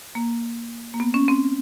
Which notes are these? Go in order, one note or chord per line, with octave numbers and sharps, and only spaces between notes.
A#3
A#3
B3
C#4
C4